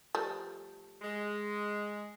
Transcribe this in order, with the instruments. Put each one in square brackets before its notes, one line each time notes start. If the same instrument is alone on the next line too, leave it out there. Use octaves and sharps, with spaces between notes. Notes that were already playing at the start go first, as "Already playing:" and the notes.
[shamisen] F3 G3 A3
[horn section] G#3